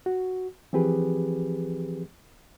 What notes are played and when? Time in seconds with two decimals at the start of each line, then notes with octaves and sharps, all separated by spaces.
0.06 F#4
0.73 E3 F3 C4 G4 G#4 B4